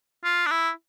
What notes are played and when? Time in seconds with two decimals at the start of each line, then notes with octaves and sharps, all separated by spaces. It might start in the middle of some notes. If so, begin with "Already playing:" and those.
0.24 F4
0.46 D4
0.51 E4